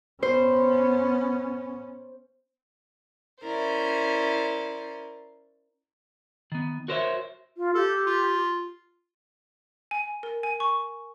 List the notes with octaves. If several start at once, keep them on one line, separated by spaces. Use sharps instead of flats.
B3 C#4 C5
C#4 E4 A#4 C5 D5
D#3 B3
F#4 A#4 C5 C#5 D#5 E5
F4
G4 A4
F4
G#5
A#4
G#5
C#6